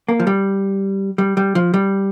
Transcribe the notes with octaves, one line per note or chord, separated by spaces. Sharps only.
A#3
F3
G3
G3
G3
F3
G3